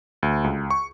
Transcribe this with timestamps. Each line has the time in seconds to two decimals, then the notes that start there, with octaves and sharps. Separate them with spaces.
0.23 D2
0.44 C#2
0.71 C#6